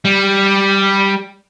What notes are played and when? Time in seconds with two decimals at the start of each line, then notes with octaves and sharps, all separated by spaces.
0.05 G3